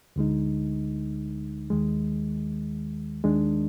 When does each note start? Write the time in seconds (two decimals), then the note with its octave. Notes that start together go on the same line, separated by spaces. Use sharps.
0.16 D2 D3 G#3 D#4
1.70 D#2 D#3 G#3
3.24 D#2 D#3 G#3 D4